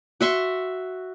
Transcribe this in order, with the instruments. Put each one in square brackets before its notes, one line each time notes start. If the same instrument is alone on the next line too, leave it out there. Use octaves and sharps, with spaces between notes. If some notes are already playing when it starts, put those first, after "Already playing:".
[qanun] F#4 E5 C6 C#6